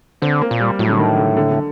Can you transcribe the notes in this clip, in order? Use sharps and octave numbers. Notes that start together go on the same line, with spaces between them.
D3 C4
A#3
A#2
G3
A2 F#3
D3
D#3
D3
D3
D3